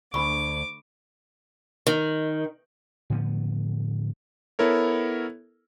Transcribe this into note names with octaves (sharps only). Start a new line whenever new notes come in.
D2 D4 B5 C#6 D6
D#3
A2 D3 F3 B3
B3 E4 A4 A#4 C#5